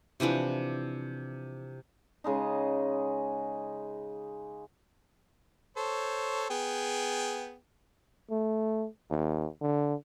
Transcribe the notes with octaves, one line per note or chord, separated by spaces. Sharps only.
C3 E3 F3 D4
C#3 G#3 D#4
A4 C5 C#5
B3 G#4 G5
A3
D#2
D3